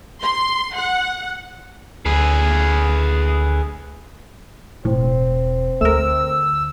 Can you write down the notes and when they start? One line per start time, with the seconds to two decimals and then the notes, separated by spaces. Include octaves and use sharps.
0.21 C6
0.75 F#5
2.06 D2 G#4 B4
4.85 E1 A2 C4
5.81 D2 A3 A#4 E6